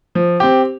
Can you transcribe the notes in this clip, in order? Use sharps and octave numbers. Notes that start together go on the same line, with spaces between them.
F3
C4 G4